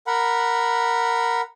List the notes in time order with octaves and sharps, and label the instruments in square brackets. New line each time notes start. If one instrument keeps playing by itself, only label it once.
[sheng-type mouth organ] A#4 F#5 B5